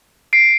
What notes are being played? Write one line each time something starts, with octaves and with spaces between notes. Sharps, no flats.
C7 D7